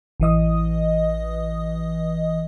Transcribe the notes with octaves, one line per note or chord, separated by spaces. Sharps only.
A1 E3 D#5 D#6